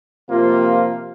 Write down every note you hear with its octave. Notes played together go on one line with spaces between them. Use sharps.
C3 F3 A#3 F4